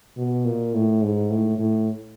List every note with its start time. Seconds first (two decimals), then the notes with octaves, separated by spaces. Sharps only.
0.17 B2
0.45 A#2
0.74 A2
1.02 G#2
1.30 A2
1.59 A2